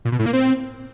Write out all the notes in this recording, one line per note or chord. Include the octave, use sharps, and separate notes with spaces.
A#2
B2
A2
A#3
C4